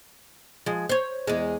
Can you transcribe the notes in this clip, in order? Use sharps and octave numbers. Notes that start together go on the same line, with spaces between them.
F3 G#3
C5 C#5
E2 G#3